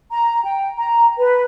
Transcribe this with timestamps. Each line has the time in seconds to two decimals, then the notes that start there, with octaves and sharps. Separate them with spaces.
0.11 A#5
0.44 G5
0.77 A#5
1.17 B4